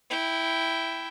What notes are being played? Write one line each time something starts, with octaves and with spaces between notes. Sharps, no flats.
E4 G5